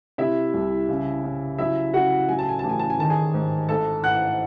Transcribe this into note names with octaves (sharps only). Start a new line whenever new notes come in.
C3 E4 E5
C2
C#3
C#3
F#3 E4 E5
C#3 F#4 F#5
F#3 G#5
A5
G#5
A1 A5
G#5
A5
G#5
D#3 A5
G#4 G#5
G#2
G#1 A4 A5
E3 F#5 F#6